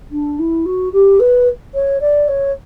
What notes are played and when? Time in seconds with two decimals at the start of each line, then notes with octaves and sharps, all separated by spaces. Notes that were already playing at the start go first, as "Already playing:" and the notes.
0.11 D4
0.38 E4
0.65 F#4
0.92 G4
1.19 B4
1.74 C#5
2.00 D5
2.28 C#5